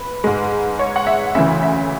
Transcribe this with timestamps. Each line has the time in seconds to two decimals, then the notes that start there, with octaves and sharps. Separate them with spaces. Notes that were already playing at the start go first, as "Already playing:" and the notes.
Already playing: B4
0.24 G#2 G#3
0.79 C#5
0.96 F#5
1.07 E5
1.35 D2 C#3 E3 E5
1.63 E5